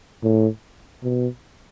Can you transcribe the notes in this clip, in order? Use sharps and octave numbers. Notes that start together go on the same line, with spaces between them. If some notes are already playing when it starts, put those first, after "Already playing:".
A2
B2